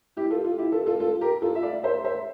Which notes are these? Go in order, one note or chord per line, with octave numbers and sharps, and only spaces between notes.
E4 G4
F4 A4
F4
E4 G4
F4 A4
F4 A4
F4 A4
G4 A#4
F4 A4
E5
D5 F5
C5 E5
C5 E5